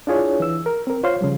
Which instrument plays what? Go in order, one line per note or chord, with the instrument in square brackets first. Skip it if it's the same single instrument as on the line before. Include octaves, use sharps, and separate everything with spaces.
[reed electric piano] D4 E4 F4 G#4 C#5
E3 E6
A#4
C4 A#4
F4 C5 C#5 F5 C6
C#3 F3 G3